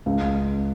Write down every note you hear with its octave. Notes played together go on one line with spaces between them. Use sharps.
C#2